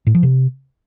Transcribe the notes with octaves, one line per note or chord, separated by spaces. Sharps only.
A2
F3
C3